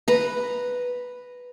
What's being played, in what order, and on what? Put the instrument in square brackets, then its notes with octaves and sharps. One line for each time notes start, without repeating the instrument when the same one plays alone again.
[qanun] B4 A#5